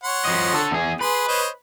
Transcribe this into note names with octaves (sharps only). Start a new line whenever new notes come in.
C#5 F#5 C6
F3 D#5
D3 A4
E2 G#4
G#4 B4 C6
C5 C#5 D#5